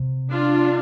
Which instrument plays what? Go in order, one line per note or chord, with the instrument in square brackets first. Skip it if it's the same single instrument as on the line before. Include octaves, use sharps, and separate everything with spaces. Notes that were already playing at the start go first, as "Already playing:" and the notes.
Already playing: [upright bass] C3
[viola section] D4 F4